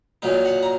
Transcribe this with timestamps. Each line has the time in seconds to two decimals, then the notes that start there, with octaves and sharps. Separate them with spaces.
0.22 A#2 F#3 A#3 D#4
0.45 F#5
0.63 A#5